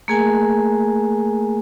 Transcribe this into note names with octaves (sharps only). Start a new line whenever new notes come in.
A3 A#3 G#4 A#4 G#5